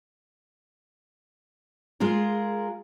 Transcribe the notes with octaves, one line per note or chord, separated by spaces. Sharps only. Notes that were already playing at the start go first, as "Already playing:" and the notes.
G#3 F4 G#4 A#4